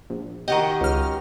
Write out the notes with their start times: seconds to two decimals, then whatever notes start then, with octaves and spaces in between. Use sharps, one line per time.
0.10 A#1
0.48 D#3 F#4 G4 D#5
0.81 C#2 F6